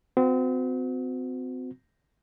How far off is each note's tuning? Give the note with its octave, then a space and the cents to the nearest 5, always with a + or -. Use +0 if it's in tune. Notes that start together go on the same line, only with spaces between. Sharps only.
C4 -35 F#4 -25